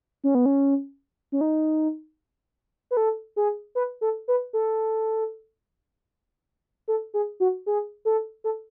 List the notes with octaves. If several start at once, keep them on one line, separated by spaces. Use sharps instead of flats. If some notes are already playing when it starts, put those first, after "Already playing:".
C#4
B3
C#4
C#4
D#4
B4
A4
G#4
B4
A4
B4
A4
A4
G#4
F#4
G#4
A4
A4